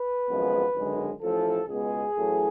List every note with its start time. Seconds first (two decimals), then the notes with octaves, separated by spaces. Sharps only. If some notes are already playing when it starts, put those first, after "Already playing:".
Already playing: B4
0.28 G#1 F#2 F3 G#3 B3
0.74 G#1 F#2 D3 G#3
1.22 A1 A2 F3 A4
1.68 C#2 B2 G#3 B3 G#4
2.15 A1 A2 F#3 A3